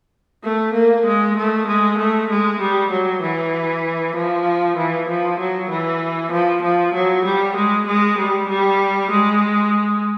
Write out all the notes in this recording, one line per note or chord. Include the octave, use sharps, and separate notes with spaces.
A3
A#3
G#3
A3
G#3
A3
G#3
G3
F#3
E3
F3
E3
F3
F#3
E3
F3
F3
F#3
G3
G#3
G#3
G3
G3
G#3